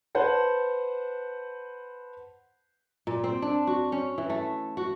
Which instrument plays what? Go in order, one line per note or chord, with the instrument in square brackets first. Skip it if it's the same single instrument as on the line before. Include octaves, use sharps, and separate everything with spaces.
[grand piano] B4 C5 F#5 A5
[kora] A#2
C4
D4
F#4
C#4
E3
A3
F#4